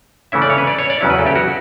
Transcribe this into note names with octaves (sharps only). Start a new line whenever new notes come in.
C#3 E3 A3 C#4 E4 E5
D5
C#5
B4
D5
C#5
D5
E2 C#3 F#3 C#4 E4
B4
A4
G4
F#4